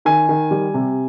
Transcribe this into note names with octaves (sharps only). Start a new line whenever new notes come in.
D#3 G#5
D#3
G3
C3